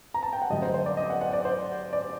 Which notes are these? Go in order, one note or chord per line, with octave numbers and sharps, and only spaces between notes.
A#5
A5
G5
F#5
G1 F#2 D3 F#3 A3 D#5
C5
C5
D5
D#5
F#5
F#5
D5
C5
D5